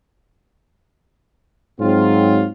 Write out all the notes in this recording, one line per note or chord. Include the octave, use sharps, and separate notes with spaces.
G#2 F#3 C4 F4